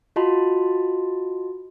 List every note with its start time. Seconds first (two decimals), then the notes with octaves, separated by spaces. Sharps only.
0.16 F4 F#4 D#5 A5 B5 C6